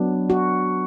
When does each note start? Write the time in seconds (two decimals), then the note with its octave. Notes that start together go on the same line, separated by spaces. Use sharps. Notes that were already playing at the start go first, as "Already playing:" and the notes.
Already playing: F#3 B3 D4
0.30 F#4